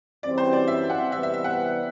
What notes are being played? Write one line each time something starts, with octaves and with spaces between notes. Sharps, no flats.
F#2 E3 G3 C4 D5
C5
D5
E5
F#5
C3 E3 G3 B3 E5
E5
E5
F#5